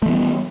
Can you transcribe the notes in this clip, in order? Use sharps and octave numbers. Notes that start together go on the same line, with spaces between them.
E3 G3 A3 B3